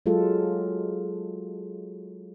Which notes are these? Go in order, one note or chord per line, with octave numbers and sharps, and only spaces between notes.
F#3 G#3 F4 A4